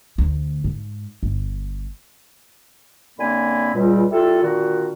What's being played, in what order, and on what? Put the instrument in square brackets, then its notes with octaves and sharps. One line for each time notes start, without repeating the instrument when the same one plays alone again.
[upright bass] D2
G#2
G1
[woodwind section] F#2 D3 A#3 C4 G#5 B5
C#2 A#2 G3
G3 E4 F4 A4
A#2 D3 D#3 F#4